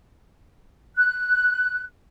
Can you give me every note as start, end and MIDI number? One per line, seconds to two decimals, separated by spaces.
0.96 1.82 90